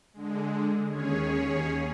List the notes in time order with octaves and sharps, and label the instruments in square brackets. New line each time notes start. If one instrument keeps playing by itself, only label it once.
[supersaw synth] D3 G#3
D#2 C#4 G#4 C#5